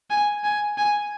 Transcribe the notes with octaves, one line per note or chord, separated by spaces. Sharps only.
G#5
G#5
G#5